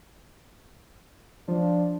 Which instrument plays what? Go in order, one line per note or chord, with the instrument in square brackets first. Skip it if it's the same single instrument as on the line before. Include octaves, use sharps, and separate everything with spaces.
[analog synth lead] F3 [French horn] D4